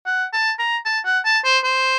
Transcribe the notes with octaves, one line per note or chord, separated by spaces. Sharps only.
F#5
A5
A#5
A5
F#5
A5
C5
C5